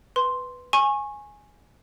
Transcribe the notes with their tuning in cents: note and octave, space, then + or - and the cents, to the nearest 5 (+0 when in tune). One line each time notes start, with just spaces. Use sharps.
B4 +0 C6 +0
G#5 +0 C#6 -25